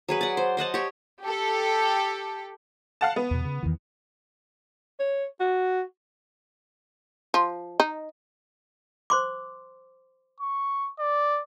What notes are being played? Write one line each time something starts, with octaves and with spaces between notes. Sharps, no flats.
F#3 G#4 B4
D5 F#5
C5
C5 D#5 F#5 A5
G4 C#5
G4 A4
F5 F#5 A5
B3
E2 B2
C#3
E2 D#3 E3
C#5
F#4
F3
D#4
C5 C6 D6
C#6
D5